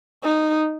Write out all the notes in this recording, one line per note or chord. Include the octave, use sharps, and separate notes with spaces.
D#4